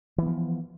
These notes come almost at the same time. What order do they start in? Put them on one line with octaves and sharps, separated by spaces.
E3 B3 F3